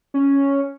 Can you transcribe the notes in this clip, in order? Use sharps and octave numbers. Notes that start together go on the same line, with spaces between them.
C#4